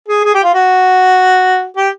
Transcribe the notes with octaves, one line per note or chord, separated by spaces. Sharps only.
G#4
G#4
G4
F4
F#4
G4